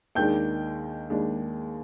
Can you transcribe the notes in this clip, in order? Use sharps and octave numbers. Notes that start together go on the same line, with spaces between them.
D#2 D#3 G#3 D4 G5 G6
D#2 D#3 G#3 D4